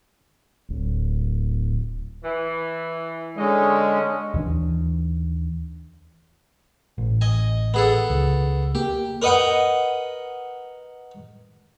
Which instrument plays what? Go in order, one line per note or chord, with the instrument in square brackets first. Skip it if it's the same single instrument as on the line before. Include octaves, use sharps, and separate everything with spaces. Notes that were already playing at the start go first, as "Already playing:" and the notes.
[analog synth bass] D1
[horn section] E3
[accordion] D3 G#3 [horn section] C#4 D#5
[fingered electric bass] D#2 E3 D4
[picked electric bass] A1
[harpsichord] D#5 G#5
B3 G#4 A4
[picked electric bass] C#2
[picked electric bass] A#3 [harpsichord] G4
[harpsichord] A#4 B4 D#5 F#5 G5